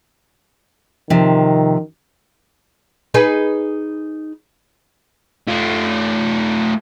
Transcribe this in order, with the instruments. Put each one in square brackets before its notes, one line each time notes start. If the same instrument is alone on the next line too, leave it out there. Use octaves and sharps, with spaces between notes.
[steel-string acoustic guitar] C3 F3 [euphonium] D#3
[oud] D#4 G#4 B4
[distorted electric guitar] A3 F4